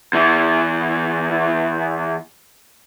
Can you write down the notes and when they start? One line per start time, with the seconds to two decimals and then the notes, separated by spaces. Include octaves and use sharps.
0.13 E2 E3